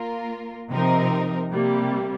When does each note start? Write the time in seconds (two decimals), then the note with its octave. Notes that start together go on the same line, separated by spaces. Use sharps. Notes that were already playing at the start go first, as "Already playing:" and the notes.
Already playing: A#3 F4 A#4
0.70 C3 F3 C4 D#4 A#4
1.51 C3 G3 A#3